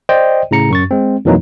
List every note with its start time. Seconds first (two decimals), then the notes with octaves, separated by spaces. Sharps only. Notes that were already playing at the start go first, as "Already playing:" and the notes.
0.09 C5 D5 D#5 G5
0.51 A2 C#3 A#5 C#7
0.70 F#2 C#6 A6
0.91 G#3 C4
1.25 F2 B2 E3 F#3 A#3 D#4